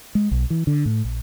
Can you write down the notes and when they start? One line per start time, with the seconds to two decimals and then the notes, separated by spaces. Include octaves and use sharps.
0.15 G#3
0.31 B1
0.50 E3
0.67 D3
0.86 A2
1.05 A#1